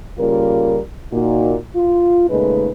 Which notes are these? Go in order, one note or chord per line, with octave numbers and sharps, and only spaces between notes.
C#3 G3 A#3 F4 A#4
A#2 D#4 F#4
F4
A#2 C#3 G#3 A3 D#4 B4